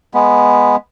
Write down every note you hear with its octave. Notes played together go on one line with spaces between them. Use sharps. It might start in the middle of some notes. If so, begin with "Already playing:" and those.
G#3 B3